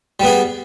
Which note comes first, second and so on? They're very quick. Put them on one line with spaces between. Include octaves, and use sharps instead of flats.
G3 B3 G#4